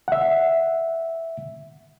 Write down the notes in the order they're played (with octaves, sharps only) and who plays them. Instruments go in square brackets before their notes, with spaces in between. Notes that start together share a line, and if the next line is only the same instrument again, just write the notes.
[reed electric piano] E5 F#5